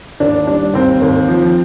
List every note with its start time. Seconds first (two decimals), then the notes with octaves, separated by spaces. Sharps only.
0.20 D#2 D4
0.47 G3 D4
0.74 D#2 C4
1.01 D#2
1.28 F3